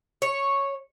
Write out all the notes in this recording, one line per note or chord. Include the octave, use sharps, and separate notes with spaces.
C#5